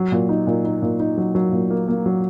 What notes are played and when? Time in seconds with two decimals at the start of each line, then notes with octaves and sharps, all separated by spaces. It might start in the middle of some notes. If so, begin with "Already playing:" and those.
Already playing: F#3
0.12 A#2
0.29 D#4
0.47 A#2
0.65 D#4
0.82 A#2
1.00 D#4
1.17 F#3
1.35 F#3
1.52 A#2
1.70 A#3
1.88 A#3
2.06 F#3